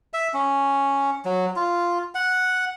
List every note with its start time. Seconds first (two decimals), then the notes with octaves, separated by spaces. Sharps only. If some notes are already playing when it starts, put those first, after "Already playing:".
0.14 E5
0.34 C#4
1.25 F#3
1.56 F4
2.15 F#5